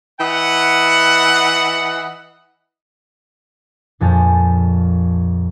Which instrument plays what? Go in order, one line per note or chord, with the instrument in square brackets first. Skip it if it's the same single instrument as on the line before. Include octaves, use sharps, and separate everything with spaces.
[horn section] E3 D#5 F#5
[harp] A#1 F2 G#5 A5 F6 G6